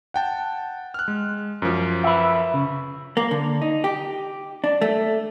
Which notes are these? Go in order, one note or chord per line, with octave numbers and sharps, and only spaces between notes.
F#5 G5 A5
F6 F#6
G#3
F#2 F3
B4 E5
C#3
A#3
D3
D#4
G4
D4
A3